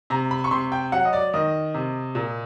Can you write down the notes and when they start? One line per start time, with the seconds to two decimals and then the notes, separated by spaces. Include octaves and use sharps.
0.10 C3 A#5
0.31 B5
0.44 C#6
0.51 C3 C6
0.72 G5
0.92 F#3 F#5
1.05 D#5
1.13 D5
1.34 D#3 D#5
1.74 C3
2.15 A#2